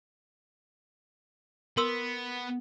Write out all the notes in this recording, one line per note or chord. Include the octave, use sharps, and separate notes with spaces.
B3 A#4 C6 E6